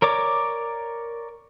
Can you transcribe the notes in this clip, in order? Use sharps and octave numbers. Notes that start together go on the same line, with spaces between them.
A#4 C#5 D5 D6